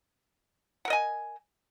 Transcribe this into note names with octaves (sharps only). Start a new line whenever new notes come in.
A#4 D#5 F#5 G#5